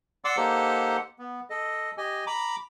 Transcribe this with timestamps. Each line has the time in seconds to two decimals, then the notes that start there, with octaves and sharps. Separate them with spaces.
0.25 D5 F#5 C6 D6 E6
0.37 A#3 D#4 G4 A4 C5 F#5
1.19 B3
1.50 A4 D#5
1.98 G4 D#5 G#5
2.27 A#5 B5 D6